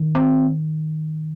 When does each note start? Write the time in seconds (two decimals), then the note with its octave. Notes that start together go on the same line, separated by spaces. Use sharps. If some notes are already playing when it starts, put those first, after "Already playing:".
Already playing: D#3
0.15 C4